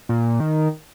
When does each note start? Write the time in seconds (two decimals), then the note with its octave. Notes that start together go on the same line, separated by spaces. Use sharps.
0.09 A#2
0.40 D#3